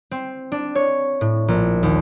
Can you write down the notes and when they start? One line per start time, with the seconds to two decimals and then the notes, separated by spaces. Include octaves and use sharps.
0.11 C4
0.52 D4
0.75 C#5
1.21 A2
1.48 A#1
1.83 D#2